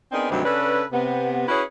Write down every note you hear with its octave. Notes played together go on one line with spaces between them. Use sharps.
B3 C4 D4 D#4 G#4 A#4
D2 G2 C3 D#3 F#3 C4
C#3 C#4 D4 A4 B4
C3 B3
C#4 E4 F#4 G#4 B4 C#5